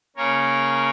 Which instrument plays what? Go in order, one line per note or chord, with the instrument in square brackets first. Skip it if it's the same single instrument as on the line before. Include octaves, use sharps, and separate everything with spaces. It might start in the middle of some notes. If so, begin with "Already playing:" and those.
[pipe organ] C#3 A#3 C#4 A#4 C#5